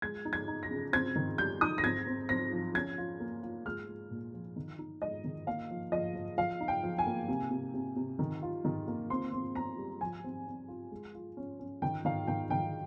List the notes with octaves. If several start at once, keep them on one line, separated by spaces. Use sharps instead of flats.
G#3 G#6
D#4
G#6
D#4
A#6
C#3
C4 G#6
D#3
G3 G6
D#4 D#6
A#6
C4 G#6
C4
C4 A#6
F3
C#4 G#6
F4
A#3
F4
G#3 F6
G#3
A#2
F3
D#3
D#4
G#3 D#5
D#3
A#3 F5
F3
F3 D#5
F3
F3 F5
D#4
G5
F3
G#5
A#3
C3
C3
C3
C3
D#3
F4
D#3
A#3
C4 C6
C4
C4 A#5
G3
F3 G#5
C4
C4
F4
G#3
F4
C#4
C#4
D#3 G5
D#3 F5
D#3 G5
D#3 G5